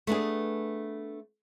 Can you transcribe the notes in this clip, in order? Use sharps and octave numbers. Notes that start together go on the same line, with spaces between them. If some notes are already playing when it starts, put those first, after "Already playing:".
A3 B3 D4 G#4